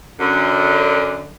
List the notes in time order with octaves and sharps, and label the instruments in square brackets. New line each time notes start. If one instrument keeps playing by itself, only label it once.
[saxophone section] F#2 D3